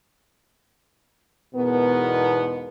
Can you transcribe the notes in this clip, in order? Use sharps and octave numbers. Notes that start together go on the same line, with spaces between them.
E2 G#2 B2 B3 A#4